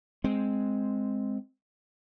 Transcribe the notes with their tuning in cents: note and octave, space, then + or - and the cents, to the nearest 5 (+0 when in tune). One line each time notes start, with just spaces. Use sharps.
G#3 +5 C4 +0